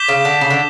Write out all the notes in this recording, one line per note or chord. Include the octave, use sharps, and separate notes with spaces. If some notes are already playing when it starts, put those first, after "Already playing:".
Already playing: D6 G6 B6 E7 G7
C#3
D3
C#3
D3